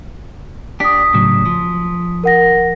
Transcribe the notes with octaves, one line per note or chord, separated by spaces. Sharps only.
D4 G4 D#6 B6
A2 C#3 F#3
F3
A#4 F#5 A#6